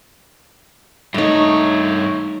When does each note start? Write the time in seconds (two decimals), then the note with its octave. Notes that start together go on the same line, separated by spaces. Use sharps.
1.14 G2 A3 D#4 C#5